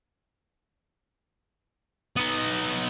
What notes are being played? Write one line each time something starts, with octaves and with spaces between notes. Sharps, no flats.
B3 D#4